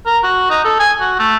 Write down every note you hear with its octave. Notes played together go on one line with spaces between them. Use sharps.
A#4
F#4
D#4
A4
G#5
F#4
A3